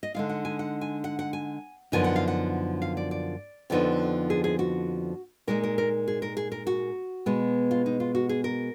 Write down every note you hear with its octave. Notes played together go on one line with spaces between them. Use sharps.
D#5
D3 G#3 D#4 F5
F#5
G#5
F#5
G#5
F#5
F#5
G#5
F#2 D3 F3 B3 D#4 G#5
F#5
F5
F#5
F5
D5
D5
F2 D3 F3 B3 D#4
G#4
G#4
F#4
A#2 G#3 D#4 A#4
A#4
A#4
G#4
A#4
G#4
A#4
F#4
B2 G#3 B3
F4
D#4
F4
F#4
G#4
A#4